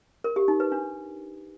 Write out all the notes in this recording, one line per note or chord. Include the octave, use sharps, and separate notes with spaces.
A#4
G4
D#4
B4
D4